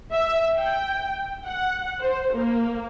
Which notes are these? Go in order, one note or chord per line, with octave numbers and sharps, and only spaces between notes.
E5
G5
F#5
C5
A#3